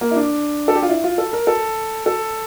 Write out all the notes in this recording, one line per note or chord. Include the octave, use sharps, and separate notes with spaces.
A#3
E4
D4
A4
G4
F4
E4
F4
A4
A#4
A4
A4